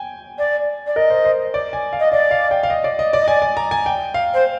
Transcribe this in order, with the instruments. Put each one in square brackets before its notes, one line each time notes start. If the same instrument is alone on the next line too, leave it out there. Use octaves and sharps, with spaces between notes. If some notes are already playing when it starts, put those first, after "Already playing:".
Already playing: [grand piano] G5 G#5
[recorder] D5
D5
[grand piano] A#4 [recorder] D#5
[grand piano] C5
C5
D5
G#5
F5
[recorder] D#5
[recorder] D5 [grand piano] D#5
[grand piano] F5
G5
F5
D#5
D5
D#5
D5
[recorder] D#5
[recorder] D5 [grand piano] G#5
[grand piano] G#5
A#5
G#5
G5
F5
[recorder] C5